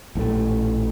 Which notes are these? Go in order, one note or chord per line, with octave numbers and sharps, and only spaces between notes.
A#1 A2 D3 A3